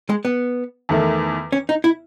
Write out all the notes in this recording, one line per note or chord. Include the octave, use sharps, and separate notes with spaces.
G#3
B3
E2 D#3 A3
C#4
D#4
E4